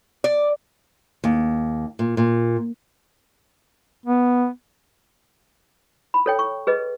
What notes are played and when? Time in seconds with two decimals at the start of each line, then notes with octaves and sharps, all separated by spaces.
0.24 D5
1.24 D#2
1.99 A#2
2.17 A#2
4.06 B3
6.14 B5
6.26 A4 C#5 G5
6.39 C#6
6.67 G#4 B4 D#5